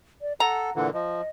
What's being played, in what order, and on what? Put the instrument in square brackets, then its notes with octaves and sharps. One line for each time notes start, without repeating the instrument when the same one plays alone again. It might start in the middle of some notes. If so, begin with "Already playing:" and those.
[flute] D5
[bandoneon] A4 [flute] F#5 [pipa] A#5
[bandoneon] A#2 D3 E3 [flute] F#5
[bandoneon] F3 [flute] D#5